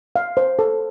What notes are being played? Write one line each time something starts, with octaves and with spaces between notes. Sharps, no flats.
F5
C5
A4